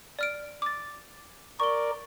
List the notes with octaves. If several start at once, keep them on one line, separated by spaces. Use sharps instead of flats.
D5 F6 D7
D6 A6
A#4 D5 C#6 G7